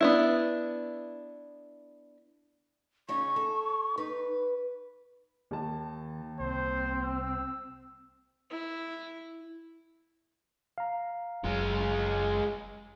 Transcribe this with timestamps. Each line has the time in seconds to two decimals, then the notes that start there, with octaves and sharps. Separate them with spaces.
0.01 B3 D4 E4
3.09 C#3 C#4 D#4 C#6
3.36 A4
3.98 D#4 B4
5.51 D#2 D#3 A5
6.40 C2 C4 C5
7.05 E6
8.50 E4
10.78 F5 A#5
11.44 F#1 F#2 G#3 F4